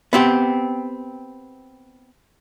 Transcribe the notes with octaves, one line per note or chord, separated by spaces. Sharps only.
B3 C4 G4